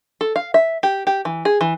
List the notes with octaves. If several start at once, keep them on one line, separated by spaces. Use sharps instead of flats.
A4
F5
E5
G4
G4
E3
G#4
E3